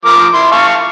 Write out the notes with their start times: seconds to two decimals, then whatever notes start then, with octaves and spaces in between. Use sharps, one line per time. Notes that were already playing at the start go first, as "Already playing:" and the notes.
0.05 F3 A#4 D6
0.34 E4 C6
0.52 F5 A5 C#6